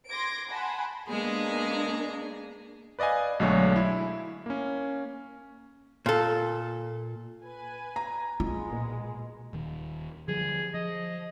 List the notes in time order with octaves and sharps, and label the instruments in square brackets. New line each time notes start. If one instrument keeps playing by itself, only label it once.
[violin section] C6 D6 G#6 A#6 D7
F#5 G#5 A5 B5 C6
[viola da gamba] G#3 B3 G#4 [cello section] A#3 D4
[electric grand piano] B4 D5 D#5 F5 G#5
B1 D3 F#3 G#3 A3 C#5
E4
A#3 C#4
[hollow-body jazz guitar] A#2 A4
[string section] B4 G#5
[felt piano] A#5
[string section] B2 G#3 [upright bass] F4
[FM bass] A#2
[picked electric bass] D#1 D#3
[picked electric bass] D3 F3 G3 [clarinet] G#4
[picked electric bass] F3 [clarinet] D#5